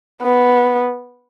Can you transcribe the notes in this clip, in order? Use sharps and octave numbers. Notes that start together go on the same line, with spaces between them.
B3